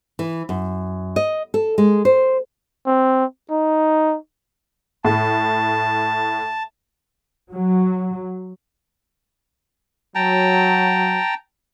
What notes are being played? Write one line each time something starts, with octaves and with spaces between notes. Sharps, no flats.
E3
F#2
D#5
A4
G#3
C5
C4
D#4
A2 A5
F#3
F#3 G5 A5 A#5